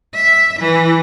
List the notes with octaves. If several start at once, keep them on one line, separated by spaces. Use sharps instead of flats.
E5
E3